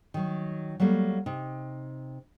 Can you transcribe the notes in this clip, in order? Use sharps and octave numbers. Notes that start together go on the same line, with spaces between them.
D#3 F#3
F#3 G3 A3 A#3
C3 D#4